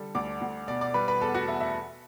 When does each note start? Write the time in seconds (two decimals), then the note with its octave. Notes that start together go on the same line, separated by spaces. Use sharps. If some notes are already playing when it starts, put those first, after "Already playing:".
Already playing: D3 G3 A4
0.15 D2 D5 D6
0.41 D2
0.68 B2 D5 D6
0.81 D5 D6
0.94 G3 B4 B5
1.08 B4 B5
1.21 E2 A4 A5
1.34 F#4 F#5
1.48 E2 E5
1.60 E5